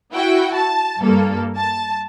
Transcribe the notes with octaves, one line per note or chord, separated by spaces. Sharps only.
E4 F#4 G5
A5
G2 A#3 A4
A5